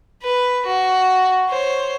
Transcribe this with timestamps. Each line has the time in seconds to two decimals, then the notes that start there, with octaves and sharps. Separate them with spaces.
0.23 B4
0.66 F#4
1.49 C5 C#5